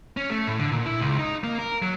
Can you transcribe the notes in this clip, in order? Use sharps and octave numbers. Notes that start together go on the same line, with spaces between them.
C#4
A3
A2
D3
A#2
E4
C#2
D#4
A#3
A#4
F#3